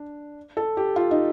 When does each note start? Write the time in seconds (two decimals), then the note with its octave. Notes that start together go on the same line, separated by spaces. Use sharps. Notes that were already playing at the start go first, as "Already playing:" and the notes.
Already playing: D4
0.57 A4
0.77 G4
0.96 F4
1.11 D#4